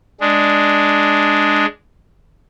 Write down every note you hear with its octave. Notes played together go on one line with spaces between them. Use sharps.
G#3 D4